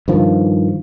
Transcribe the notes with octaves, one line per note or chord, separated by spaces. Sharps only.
G2 D#3 F3